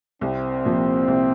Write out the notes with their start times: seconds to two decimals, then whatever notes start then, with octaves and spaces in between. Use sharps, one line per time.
0.21 C2 C4
0.65 A#2 F3
1.08 C2